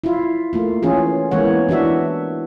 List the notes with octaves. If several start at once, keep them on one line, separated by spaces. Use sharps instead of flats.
E4 F4
A3 A#3 F4
E3 C#4 F4 G#4
E3 G#3 A#3 B3 C#5 F#5
E3 D4 F#4 E5